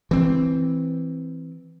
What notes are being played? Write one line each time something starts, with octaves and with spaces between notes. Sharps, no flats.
E3 C4